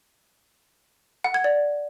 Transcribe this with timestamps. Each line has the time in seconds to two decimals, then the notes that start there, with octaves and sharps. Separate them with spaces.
1.24 F#5
1.34 G#6
1.44 D5